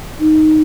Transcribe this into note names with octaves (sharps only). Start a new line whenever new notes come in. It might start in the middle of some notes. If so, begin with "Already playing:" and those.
D#4